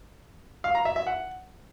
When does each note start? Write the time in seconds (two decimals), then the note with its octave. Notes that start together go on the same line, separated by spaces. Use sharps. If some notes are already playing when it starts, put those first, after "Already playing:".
0.64 F5
0.75 A#5
0.85 E5
0.96 E5
1.07 F#5